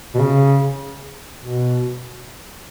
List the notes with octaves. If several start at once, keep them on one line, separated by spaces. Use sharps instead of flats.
B2
C#3
B2